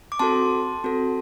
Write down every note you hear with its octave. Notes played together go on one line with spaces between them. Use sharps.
D6
C4 F#4 A4 A5 C6
C4 F#4 A4